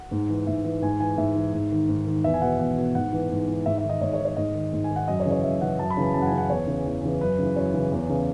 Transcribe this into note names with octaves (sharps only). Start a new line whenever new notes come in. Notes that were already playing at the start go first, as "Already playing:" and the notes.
Already playing: F#5
G#2
E3
G#2 E5
E3
G#2 G#5
E3 G#5
G#2 E5
E3
G#2
D#3
G#2
D#3
E2 E5
G#5
B2 F#5
E2 F#5
B2
G#2 F#5
E3
G#2
E3
G#2 E5
E5
D#3
D#5
G#2 C#5
C#5
D#3
C#5
G#2 D#5
D#3
G#2
G#5
D#3
F#5
F#2 D#5
C#5
C#3 E3
C#5
F#2 E5
C#3 E3 F#5
F#2 A5
B5
C#3 E3
A5
F#2 A5
F#5
G#5
C#3 E3
F#5
E2 C#5
C#3 E3
E2
C#3 E3
F#2 B4
C#3 E3
F#2 C#5
C#3 E3
E2
C#3 E3